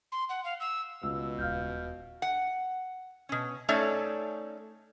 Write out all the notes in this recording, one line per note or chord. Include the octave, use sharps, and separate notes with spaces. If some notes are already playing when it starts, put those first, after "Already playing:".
C6
F#5
F5
E6
C#2 B2 E6
D#1 F5 F6 G6
F#5
B2 C#4
A3 C#4 D#4 A4 C#5 D5